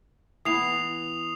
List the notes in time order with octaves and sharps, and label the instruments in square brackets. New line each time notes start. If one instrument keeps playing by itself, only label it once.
[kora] E3 B3 [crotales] D#6 C7 F7